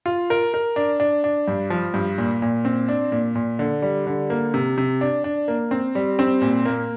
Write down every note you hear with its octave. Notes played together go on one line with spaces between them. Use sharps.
F4
A#4
A#4
D4
D4
D4
G2
F3
G2
A#2
A#2
C4
D4
A#2
A#2
D3
G3
D3
A#3
C3
C3
D4
D4
A#3
C4
G3
C4
A#2
A#3